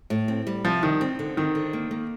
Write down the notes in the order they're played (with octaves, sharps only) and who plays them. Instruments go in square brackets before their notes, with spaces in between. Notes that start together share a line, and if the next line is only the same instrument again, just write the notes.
[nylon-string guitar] A2
C4
G3
[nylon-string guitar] C3 [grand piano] F3
[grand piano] D#3 [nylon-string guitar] G3
[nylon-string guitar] C4
D3
[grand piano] D#3 [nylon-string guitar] C4
[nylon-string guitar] D3
A#3
A#3